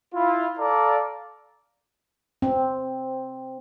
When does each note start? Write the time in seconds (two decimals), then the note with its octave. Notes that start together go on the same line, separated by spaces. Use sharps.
0.15 E4 F4
0.60 A4 D5 F5 A#5
2.42 C4